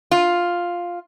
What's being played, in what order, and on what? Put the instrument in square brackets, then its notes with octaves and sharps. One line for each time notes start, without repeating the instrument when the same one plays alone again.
[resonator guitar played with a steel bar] F4